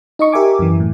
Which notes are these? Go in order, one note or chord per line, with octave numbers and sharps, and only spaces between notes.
D#4 D#5 C#6
G4 A#4 E5 G#5 D6
F#2 E3
A2